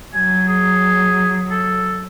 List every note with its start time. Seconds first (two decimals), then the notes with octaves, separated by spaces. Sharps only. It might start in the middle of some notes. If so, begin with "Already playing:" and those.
0.14 F#3 G#5
0.48 G#4
1.50 A4